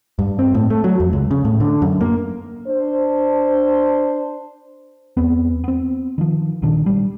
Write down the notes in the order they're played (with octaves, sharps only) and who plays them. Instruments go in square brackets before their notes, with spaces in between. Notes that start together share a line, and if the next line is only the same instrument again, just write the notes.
[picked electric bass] G2
C4
A2
A3
F#3
F2
C#2
C#3
A2
D3
F#2
A#3
[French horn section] D4 C5
[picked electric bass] E2 B3 C4
B3 C4
D#3 F3
A#1 A#2 D#3 D4
G3